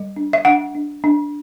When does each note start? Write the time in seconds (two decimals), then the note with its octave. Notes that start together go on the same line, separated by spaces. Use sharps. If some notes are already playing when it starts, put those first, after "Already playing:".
Already playing: G3
0.16 D4
0.33 E5
0.45 D4 F#5
0.75 D4
1.04 D4